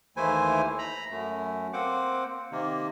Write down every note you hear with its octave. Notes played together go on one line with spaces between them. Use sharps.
D#2 E3 A3 E4 C5 G#5
A#5 B5
F#2 A3
A#3 C4 C5 F#5 D6
C3 D#3 A#3